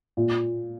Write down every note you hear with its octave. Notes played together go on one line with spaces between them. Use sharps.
A#2